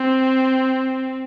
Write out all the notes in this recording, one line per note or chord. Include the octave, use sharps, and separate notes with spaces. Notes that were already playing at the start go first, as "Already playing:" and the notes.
Already playing: C4